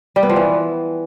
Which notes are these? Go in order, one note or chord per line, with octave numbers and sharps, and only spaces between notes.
G3
B3
F3
E3